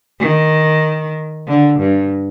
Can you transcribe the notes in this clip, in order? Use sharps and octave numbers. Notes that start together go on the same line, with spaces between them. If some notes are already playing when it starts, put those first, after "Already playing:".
D#3
D3
G2